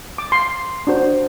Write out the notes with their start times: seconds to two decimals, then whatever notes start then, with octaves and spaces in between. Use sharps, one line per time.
0.18 D6
0.32 C6
0.87 D4 F#4 C5